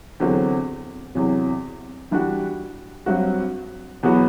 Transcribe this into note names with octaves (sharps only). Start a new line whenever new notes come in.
E2 D3 F#3 C4 F#4
E2 C3 F#3
E3 G3 D4 F#4
G2 F#3 C4 F#4
E2 B2 F#3 B3 F#4